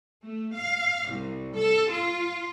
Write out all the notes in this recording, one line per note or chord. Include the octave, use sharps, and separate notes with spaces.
A3
F5
C2
A4
F4